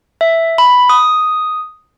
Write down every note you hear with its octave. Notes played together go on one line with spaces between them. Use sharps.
E5
B5
D#6